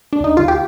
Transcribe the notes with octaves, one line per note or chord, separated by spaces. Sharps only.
D4
D2 D#4
D2 F4
G4